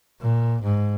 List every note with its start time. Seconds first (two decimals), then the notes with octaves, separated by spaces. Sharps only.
0.21 A#2
0.62 G#2